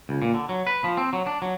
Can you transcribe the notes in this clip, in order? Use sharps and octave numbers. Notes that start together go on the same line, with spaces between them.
C#2
A#2
D3
F#3
B4
F3
C4
F#3
D4
F#3